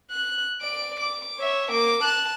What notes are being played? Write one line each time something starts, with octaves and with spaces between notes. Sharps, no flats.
F#6
D5 D7
D6
C#5 E5
A#3 D6
A5 F#6